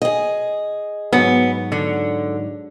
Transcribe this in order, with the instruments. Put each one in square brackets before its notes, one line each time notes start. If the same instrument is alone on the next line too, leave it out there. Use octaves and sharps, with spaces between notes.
[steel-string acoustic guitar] G#4 D#5
[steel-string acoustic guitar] G#2 F#3 [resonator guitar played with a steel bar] B3
[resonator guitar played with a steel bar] D3